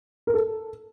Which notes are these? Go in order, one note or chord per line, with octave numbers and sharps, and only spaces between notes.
A#4
A4